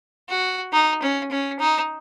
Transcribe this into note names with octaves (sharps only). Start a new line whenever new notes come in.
F#4
D#4
C#4
C#4
D#4